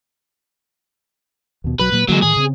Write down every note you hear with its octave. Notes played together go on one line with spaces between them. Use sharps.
D#2 B2
B1 F#3 B4
A#2 F#3 A#3
D3 E3 F#3 G#3 A#3
A2 D#3 G#4
C#3 C4